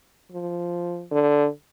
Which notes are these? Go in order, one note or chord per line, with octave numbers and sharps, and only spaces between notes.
F3
D3